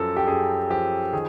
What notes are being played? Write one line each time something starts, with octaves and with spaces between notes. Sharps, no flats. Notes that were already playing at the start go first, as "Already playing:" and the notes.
Already playing: F#2 F3 A4 A#4
G4
F#2 G#4
F3 G4
D#3 G#4